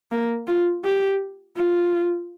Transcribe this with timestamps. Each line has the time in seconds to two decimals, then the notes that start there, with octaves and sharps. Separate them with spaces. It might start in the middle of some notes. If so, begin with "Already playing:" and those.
0.11 A#3
0.48 F4
0.84 G4
1.57 F4